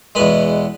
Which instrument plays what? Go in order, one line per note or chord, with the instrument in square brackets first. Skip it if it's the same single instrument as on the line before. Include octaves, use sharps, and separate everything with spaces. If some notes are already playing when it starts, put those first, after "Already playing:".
[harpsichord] E2 B2 G#3 B4